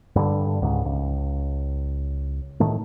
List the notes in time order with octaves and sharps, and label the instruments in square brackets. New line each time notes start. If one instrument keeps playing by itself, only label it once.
[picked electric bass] G2 D3
C#2 G#2
C#2
A2 D#3 A3